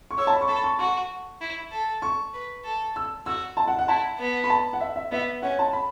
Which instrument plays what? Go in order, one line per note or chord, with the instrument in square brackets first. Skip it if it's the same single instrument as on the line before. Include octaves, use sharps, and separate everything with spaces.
[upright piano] C#6
[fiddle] C#5 [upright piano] E6
[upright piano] A5
B5
C#6
[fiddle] A4 [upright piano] B5
[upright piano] C#6
[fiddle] F#4 [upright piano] C#6
[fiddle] E4
A4
[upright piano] C#6
[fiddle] B4
A4
[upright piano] E6
[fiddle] F#4 [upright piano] E6
[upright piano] A5
F#5
F#5
[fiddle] E4 [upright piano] A5
[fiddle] B3
[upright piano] B5
A5
F#5
E5
E5
[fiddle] B3 [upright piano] E5
[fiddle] C#4 [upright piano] F#5
[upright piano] A5
B5